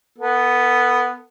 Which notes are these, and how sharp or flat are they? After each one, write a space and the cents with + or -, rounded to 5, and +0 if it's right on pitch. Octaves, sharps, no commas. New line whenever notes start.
B3 +0 A4 +35